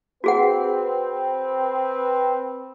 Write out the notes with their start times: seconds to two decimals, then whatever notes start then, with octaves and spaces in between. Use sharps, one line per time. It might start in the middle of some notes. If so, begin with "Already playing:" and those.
0.24 C4 F#4 G#4 B4 F#5